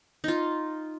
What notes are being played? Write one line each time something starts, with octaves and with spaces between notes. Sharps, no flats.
D#4 F4